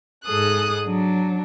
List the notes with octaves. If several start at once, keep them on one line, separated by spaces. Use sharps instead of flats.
G#2 G#4 A4 D#6 F#6
F#3 D4